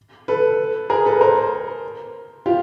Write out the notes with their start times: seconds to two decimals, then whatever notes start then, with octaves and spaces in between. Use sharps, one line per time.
0.28 A4 B4
0.90 G#4 A#4
1.05 A4 B4
1.21 A#4 C5
2.46 F4 G4